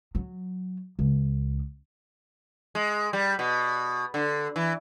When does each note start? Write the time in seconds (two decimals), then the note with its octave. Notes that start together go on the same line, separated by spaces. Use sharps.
0.15 F#3
0.99 C#2
2.75 G#3
3.13 G3
3.39 B2
4.14 D3
4.56 E3